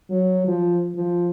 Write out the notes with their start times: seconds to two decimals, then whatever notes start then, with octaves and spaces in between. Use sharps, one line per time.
0.10 F#3
0.47 F3
0.95 F3